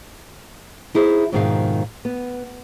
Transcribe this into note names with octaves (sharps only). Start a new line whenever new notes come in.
D#4 E4 G#4 C5
F2 G#2 B2 D#3 G#4 F5
B3